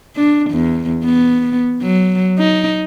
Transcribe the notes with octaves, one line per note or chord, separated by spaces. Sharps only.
D4
E2
B3
F#3
D#4